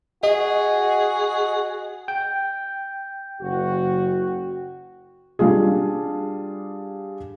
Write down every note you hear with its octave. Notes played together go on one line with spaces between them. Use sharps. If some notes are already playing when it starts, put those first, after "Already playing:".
F#4 G#4 D#5
G5
F#1 F#4
G3 D4 F4 G#4